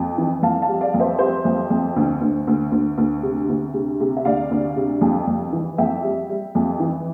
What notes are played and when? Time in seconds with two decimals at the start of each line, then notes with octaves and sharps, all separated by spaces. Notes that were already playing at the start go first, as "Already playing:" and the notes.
Already playing: F2
0.18 E3
0.42 F2 F5 A5
0.62 F5 A5
0.68 G3
0.81 D5 F5
0.94 F2
1.00 C5 E5
1.19 G3 C5 E5
1.45 F2
1.70 F2
1.96 D2
2.21 D2
2.47 D2
2.72 D2
2.98 D2
3.23 C3
3.49 D2
3.74 C3
4.00 C3
4.17 E5
4.25 D2 D5 F5
4.51 D2
4.76 C3
5.01 F2
5.27 F2
5.53 E3
5.78 F2 E5 G5
6.03 G3
6.29 G3
6.55 F2
6.80 E3